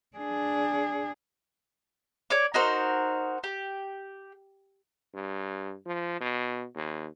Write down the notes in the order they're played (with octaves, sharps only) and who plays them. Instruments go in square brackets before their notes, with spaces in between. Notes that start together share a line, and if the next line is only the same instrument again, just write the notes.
[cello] D4 G#4
[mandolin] C#5 D5 D6
D#4 F#4 A#4 C5
G4
[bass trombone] G2
F3
B2
D#2